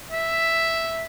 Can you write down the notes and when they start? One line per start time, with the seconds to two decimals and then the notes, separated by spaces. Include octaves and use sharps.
0.12 E5